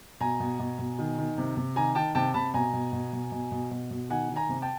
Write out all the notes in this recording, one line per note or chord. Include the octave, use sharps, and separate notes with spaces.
B2 G#5 A#5
B2
B2
B2
D#3
D#3
C3
C3
D#3 G#5 A#5
D#3 G5 A5
C3 G5 A5
C3 A5 B5
B2 G#5 A#5
B2
B2
B2
B2
B2
B2
B2
D#3 F#5 G#5
D#3
G#5 A#5
C3
G5 A5